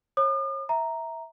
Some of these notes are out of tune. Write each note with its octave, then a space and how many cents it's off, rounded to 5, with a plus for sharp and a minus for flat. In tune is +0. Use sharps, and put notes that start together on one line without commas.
C#5 -35 D#6 -45
E5 -15 A#5 +0